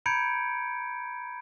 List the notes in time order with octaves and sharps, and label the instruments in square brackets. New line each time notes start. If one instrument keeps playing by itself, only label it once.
[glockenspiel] A#5 B5 G6 G#6 C#7 D7